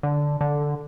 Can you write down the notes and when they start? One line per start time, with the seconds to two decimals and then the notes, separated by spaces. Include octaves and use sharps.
0.03 D3
0.41 D3